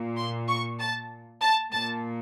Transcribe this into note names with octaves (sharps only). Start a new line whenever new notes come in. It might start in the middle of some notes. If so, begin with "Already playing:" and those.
Already playing: A#2
C6
C#6
A5
A5
A#2 A5